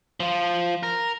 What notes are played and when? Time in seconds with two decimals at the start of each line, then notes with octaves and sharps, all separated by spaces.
0.20 F3 F4
0.83 A#4